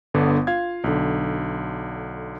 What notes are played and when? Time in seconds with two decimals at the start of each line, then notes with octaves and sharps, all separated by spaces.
0.14 G1 D3 B3
0.47 F4 F5 G#6
0.84 B1 D3